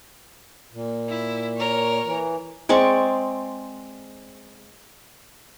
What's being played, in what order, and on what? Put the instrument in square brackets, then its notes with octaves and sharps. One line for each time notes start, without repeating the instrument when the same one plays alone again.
[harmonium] A#2
[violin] E4
A#4 C#5
[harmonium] E3
[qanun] G#3 C4 D5 C#6